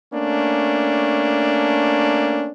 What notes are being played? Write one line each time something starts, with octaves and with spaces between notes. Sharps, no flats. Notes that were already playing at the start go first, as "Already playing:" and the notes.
A3 A#3 C#4 D4